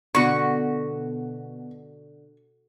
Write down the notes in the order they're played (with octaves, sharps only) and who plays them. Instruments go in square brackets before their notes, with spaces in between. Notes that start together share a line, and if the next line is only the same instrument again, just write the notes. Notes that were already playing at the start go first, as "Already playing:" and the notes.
[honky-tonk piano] B2 [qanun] D3 F#4 [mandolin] C#6